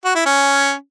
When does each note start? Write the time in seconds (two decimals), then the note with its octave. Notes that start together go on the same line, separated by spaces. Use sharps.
0.05 F#4
0.15 E4
0.26 C#4